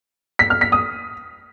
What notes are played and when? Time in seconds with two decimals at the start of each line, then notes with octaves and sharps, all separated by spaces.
0.39 B6
0.50 F6
0.61 B6
0.72 D#6